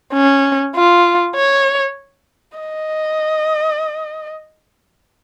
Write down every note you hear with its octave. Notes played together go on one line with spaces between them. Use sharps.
C#4
F4
C#5
D#5